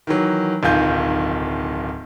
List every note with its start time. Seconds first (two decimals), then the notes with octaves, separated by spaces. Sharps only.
0.07 D#3 E3 F#3
0.63 D1 B1 D#3 F4 G#5 G6